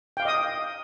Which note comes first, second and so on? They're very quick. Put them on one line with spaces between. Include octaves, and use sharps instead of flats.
G5 F5 D6 D#5 D#6